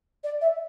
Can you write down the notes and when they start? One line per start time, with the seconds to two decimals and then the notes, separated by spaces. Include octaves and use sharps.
0.23 D5
0.41 E5